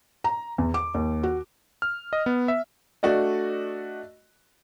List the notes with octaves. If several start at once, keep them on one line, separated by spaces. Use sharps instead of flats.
A#5
E2
D6
D#2
F#4
F6
D#5
B3
E5
A3 D4 F#4 D5 D#5